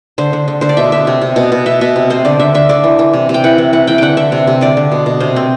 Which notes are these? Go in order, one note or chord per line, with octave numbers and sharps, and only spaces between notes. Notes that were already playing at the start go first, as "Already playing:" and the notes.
D3 C5
D3
D3
D3 C5
D5
B2 E5
B2 E5
C3
C3
B2
B2
B2 E5
B2 E5
C3
C3 C5
D3 D5
D3 E5
D3 E5
D3 D5
E3
E3
C3
C3
G5
E3 F#5
E3
E3 F#5
E3 G5
D3 F#5 G5
D3 E5
C3
C3
D3 D5
D3
B2
B2
C3 C5
C4